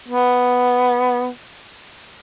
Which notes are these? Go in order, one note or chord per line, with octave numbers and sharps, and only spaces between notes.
B3